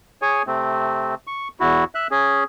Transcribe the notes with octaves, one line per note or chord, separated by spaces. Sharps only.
G#4 C#5 G#5
C3 A3 C4
C#6
E2 E4 F#4
E5 F#6
C#4 G#4